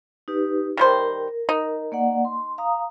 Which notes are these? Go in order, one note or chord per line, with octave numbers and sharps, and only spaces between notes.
D#4 G4 B4
D#3 G3 A#4 C5
D#4
A#3 D5 F#5
C6
F5 A#5 D#6